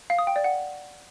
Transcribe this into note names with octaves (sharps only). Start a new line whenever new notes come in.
F5
D#6
G5
D5
F#5